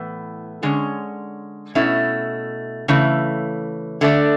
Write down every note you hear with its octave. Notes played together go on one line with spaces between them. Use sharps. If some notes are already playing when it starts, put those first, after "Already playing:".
Already playing: A2 E3 B3
D3 G#3 C#4
B2 A3 C#4 E4
C#3 E3 A3
D3 A3 D4